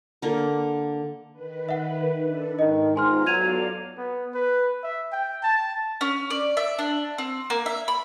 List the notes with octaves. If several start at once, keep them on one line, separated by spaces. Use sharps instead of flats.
D3 A#3
D#3 B4
E5 F#5
D4 A4
G#2 D#3 D#5
G#2 B3 F4 G#5 A#5 C6 F6
F#3 A4 D5 F5 G#6 D#7 F7
B3
B4
E5
G5
A5
C#4
D5
E5
D4
C4
A#3
E5
B5